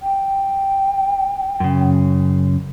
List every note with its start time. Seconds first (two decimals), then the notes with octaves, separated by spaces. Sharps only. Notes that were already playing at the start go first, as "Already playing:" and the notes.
0.02 G5
1.60 F#2 C#3